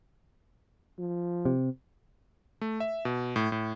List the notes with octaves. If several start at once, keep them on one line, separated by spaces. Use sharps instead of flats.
F3
C3
A3
E5
B2
A2
A2